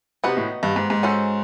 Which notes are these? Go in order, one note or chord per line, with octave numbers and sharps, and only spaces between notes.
C3 B3 D#4 F#4 B4
A2
G2
G#2
G#2
C#4 F#4 A4 C5